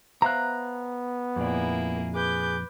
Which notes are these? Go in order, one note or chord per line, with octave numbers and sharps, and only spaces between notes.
B3 C5 E5 F5 A#5 F#6
F2 A#2 A#3 E4 G#4 D5
G#4 B4 D6 G6